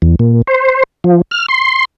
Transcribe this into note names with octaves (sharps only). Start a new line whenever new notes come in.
E2
A#2
C5
F3
F6
C6